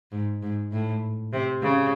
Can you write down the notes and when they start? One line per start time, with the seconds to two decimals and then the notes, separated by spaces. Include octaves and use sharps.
0.12 G#2
0.42 G#2
0.72 A2
1.33 C3
1.63 C#3